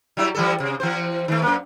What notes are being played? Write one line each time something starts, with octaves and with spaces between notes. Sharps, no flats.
F#3 G3 E4
E3 G3 A4
C3
E3 C4 C5
D#3 A3
F#2 A#3